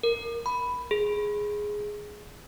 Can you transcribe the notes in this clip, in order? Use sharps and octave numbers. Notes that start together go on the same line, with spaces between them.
A#4
B5
G#4